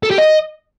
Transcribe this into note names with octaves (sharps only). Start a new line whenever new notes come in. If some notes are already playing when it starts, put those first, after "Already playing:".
A4
G4
D#5